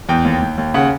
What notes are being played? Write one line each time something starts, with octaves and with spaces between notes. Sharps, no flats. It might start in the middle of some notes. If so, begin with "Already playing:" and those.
E2 G5
D#2
D#2
D#2
C#3 F#5